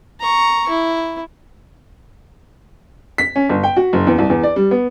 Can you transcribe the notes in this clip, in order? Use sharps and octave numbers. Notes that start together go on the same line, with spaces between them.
A#5 C#6
E4
B6
C#4
G1
G5
F#4
F#1
E2
C2
E2
D5
G3
B3